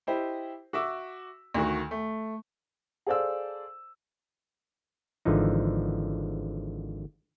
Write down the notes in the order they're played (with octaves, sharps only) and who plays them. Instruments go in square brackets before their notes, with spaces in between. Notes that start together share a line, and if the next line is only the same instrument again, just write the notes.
[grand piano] E4 G4 C5 D#5
F#4 E5 D6 E6
D2 D#3 F#4
A3
[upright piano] G#4 A4 C5 D5 F5 E6
[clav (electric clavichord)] G#1 D3 E3 F3 D#4